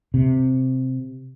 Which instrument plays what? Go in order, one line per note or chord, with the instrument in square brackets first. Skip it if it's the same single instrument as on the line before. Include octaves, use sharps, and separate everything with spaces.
[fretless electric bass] C3